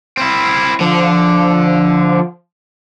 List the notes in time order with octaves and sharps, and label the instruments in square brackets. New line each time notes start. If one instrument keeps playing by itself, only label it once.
[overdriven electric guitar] C4 E4
[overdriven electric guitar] D3 [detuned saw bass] F3